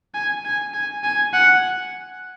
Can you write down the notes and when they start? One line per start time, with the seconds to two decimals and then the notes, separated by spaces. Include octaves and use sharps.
0.14 G#5
0.45 G#5
0.74 G#5
1.04 G#5
1.34 F#5